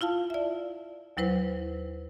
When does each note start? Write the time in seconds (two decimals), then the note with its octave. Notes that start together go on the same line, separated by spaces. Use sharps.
0.01 E4 F4 F5 A5
0.30 D5 E5
1.17 D#2 F#3 E4 B4 C5